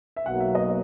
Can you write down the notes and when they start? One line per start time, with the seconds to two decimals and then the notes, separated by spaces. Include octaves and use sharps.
0.16 E5
0.26 B1 B2 F#3 A#3 F#5
0.40 E5
0.55 D#5